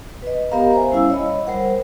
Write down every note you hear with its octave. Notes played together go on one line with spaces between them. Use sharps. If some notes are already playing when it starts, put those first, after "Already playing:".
B4 D#5
B3 G4 A#4 D#5 F5 A#5
C5 E5 G#5
G3 C#4 E4 F5 E6
C#5 D#5 B5
G3 A#4 C5 F#5